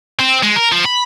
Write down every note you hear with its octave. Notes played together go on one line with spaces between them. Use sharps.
C4
G#3
A#4
F3
B5